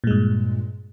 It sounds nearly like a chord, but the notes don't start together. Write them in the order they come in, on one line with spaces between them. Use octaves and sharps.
A#2 G#3 G2